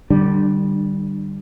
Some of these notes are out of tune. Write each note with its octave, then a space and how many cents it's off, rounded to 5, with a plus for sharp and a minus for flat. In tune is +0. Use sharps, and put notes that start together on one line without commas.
D3 +30 G3 -10 D4 +15